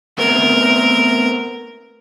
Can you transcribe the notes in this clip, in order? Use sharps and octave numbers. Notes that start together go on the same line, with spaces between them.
A3 B3 C4 A#4